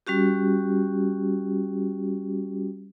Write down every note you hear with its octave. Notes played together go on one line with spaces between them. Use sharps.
G3 C#4 F#4 G4